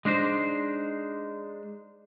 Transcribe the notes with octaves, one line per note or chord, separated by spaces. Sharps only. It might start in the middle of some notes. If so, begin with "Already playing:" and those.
G#3 D4 D#4 C5